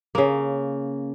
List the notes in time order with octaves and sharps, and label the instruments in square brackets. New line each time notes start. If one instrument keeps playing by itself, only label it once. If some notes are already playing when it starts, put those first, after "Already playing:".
[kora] C#3 A#3